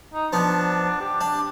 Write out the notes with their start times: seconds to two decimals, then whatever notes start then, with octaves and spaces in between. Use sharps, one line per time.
0.13 D#4
0.33 F3 B3 D4
1.00 G4
1.21 D4